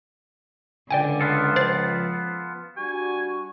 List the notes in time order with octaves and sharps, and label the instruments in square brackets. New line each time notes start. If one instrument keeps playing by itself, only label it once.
[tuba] C#2 [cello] D3 [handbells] D5 G5 G#5
[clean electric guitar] B3 F4 A4
[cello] F3 [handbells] C5 A6 C7
[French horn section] G3 D4 F#4 [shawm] G#5 [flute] C#6